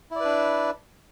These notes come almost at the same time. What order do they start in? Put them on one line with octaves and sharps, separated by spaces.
E4 D5 B4 D4